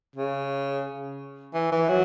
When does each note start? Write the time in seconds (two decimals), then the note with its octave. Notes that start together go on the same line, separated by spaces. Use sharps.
0.16 C#3
1.54 E3
1.72 E3
1.89 F#3